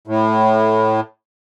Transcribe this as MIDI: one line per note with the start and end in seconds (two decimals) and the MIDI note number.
0.08 1.00 45